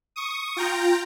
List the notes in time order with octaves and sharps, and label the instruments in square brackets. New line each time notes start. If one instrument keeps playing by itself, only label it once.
[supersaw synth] C#6 D#6
F4 G5 A#5